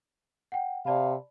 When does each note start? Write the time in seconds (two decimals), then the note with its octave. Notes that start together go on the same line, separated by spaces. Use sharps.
0.52 F#5 G5
0.86 C3 D5 F5 A5 B5